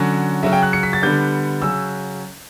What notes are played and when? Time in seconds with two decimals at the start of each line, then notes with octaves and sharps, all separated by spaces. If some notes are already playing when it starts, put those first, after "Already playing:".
Already playing: D3 F#3 C#4
0.43 C#3 F#3 C#4 E5
0.53 G5
0.63 F#6
0.73 C#7
0.83 B6
0.93 A6
1.02 D3 G3 B3 D4 G6
1.61 C#3 F#3 C#4 E6